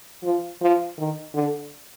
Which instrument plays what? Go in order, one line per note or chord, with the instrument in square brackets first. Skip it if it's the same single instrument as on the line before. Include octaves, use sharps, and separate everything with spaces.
[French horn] F3
F3
D#3
D3